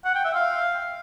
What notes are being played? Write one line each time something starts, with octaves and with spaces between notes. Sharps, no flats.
F#5
G5
E5
F5